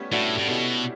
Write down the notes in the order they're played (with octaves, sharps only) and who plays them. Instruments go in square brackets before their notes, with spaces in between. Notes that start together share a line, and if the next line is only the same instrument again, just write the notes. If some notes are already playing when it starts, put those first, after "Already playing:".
Already playing: [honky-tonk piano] G3 A3 B3 C#4
[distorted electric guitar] A2 [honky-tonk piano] D4 F#4
[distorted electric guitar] A2
[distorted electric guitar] B2 [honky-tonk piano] E4 G4